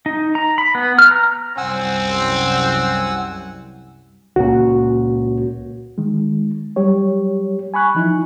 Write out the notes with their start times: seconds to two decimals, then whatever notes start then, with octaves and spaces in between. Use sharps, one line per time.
0.06 D#4
0.35 A#5
0.58 B5
0.75 B3
0.99 F6
1.11 A#5
1.58 C2 F#2 C4 F#5 G#5 E6
4.36 C#2 A#2 F#4
5.98 D#3 G#3
6.76 F#3 G3 G4 C#5
7.74 G#5 B5 C#6 F#6
7.95 E3 F3 D#4 E4